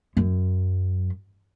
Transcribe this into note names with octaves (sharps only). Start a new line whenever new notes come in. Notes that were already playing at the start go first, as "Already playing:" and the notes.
F#2